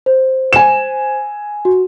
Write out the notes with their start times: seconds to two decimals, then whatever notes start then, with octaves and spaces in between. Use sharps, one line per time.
0.06 C5
0.53 G#5 E7
1.65 F#4